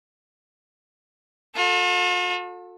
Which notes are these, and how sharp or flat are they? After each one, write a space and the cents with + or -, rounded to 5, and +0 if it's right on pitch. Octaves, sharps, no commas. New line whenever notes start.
F4 +45 A4 +10